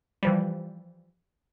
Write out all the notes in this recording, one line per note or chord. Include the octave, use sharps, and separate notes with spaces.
E3 F3 G3